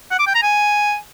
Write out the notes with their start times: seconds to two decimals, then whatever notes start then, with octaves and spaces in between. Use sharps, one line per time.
0.11 F#5
0.19 D6
0.27 G5
0.35 A#5
0.43 G#5